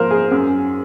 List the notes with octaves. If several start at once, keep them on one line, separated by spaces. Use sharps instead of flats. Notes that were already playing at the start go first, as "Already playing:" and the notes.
Already playing: G#2 F3 A#3 A#4 C5
G#4
F#2